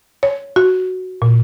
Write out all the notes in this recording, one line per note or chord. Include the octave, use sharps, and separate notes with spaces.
C#5
F#4
A#2